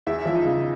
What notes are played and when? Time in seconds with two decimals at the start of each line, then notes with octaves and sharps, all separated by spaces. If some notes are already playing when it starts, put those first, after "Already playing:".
0.07 E2 E4 E5
0.25 F3 E5
0.35 D#4 D#5
0.45 C#3